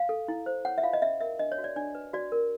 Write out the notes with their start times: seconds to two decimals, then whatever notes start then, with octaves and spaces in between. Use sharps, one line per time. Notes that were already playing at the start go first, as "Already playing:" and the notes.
Already playing: F5
0.09 A4
0.28 E4
0.46 C5
0.65 C#5 F#5
0.78 E5
0.83 F4 F5
0.93 D#5
1.02 C#4 E5
1.20 A#4 E5
1.39 D4 D#5
1.52 C#5
1.58 F#4
1.64 D5
1.76 D4 D5
1.95 B4
2.13 F#4 D5
2.32 A#4